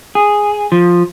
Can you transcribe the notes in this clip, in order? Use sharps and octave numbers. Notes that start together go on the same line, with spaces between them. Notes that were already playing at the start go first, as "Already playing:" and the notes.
G#4
F3